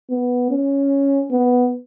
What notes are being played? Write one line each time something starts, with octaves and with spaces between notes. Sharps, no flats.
B3
C#4
B3